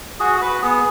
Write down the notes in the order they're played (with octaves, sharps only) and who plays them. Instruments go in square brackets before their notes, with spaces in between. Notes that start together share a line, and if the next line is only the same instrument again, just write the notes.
[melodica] F#4 G#4
F#4 B4
B3 G#4